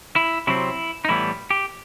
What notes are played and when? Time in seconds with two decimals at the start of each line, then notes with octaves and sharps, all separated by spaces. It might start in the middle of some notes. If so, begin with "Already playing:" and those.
0.16 E4
0.47 C3 F#3 C4 E4
1.05 D#4
1.09 A2 E3 G3 B3 E4
1.50 G4